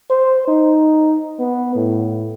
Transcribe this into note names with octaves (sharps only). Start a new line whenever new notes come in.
C5
D#4
B3
A2